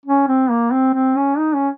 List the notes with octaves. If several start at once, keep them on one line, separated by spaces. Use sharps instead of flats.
C#4
C4
A#3
C4
C4
C#4
D#4
C#4